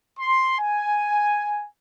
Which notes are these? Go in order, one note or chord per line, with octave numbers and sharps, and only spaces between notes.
C6
G#5